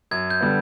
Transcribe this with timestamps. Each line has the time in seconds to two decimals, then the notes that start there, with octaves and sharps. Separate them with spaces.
0.11 F#2 G#6
0.30 G6
0.41 D3 G3 B3